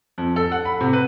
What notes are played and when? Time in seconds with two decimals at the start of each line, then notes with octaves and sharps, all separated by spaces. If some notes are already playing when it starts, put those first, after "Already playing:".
0.18 F2
0.36 A4
0.52 F#5
0.65 B5
0.81 C3
0.93 B4